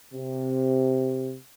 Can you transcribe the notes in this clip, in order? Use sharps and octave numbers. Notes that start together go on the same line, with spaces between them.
C3